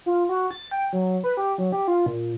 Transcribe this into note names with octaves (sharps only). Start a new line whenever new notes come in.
F4
F#4
A6
G5
F#3
B4
G4
F#3
G4
F4
A#2